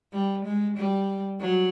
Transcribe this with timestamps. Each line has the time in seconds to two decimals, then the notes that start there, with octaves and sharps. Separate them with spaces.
0.13 G3
0.45 G#3
0.77 G3
1.41 F#3